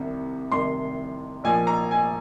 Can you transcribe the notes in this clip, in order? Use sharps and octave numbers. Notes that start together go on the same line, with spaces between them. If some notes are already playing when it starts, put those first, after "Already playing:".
Already playing: C2 C3 D#3
C2 C3 D#3 C6
A#1 A#2 F3 G#5
A#5
G#5